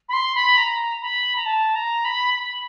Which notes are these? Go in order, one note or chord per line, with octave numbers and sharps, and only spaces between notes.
B5
C6
B5
A#5
B5
A#5
A5
A#5
B5
B5